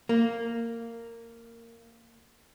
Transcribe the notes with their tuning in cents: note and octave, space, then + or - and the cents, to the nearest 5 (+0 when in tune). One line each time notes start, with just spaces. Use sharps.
A#3 -15